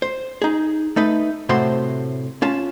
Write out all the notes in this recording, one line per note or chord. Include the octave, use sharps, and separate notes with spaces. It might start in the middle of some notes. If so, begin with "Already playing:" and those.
C5
D#4 G#4
A3 D#4 B4
A2 C3 C4 F#4 C5 C6
C#4 F4 A5